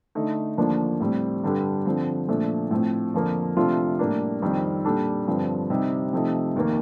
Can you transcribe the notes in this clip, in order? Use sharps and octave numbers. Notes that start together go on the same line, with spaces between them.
D3 A3 D#4
D#2 D3 F3 A#3 D4
A2 G3 C4
G2 D3 G3 D4 A4
D3 F3 C4
A#2 F3 A3 D4
A2 F3 C4
F2 D3 F3 A#3
C3 F3 A3 D4 F4
A2 G3 A#3 D4
F2 D#3 G3 C4
A#2 G3 D4 A4
G2 D3 F3 C4
C3 G3 C4 D#4
C3 F3 A3 D#4
F1 D#2 D#3 A#3